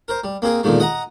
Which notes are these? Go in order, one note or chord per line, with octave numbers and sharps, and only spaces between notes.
A#4 C5
G3
A#3 C4 G#4 A#4
E2 A#2 D3 D#3 F3 G#3
D#5 F#5 A#5